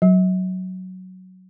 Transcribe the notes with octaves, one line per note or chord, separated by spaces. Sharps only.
F#3